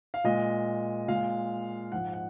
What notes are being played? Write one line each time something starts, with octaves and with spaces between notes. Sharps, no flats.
F5
A#2 G#3 D#5
A#2 G#3 F5
G#2 F3 G#3 F#5
F#5